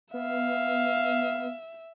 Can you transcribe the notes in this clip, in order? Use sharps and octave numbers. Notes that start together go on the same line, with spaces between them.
B3 E5 F5